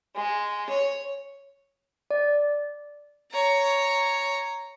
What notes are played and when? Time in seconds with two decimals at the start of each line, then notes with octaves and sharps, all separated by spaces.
0.16 G#3
0.70 C#5
2.11 D5
3.31 C#5 A#5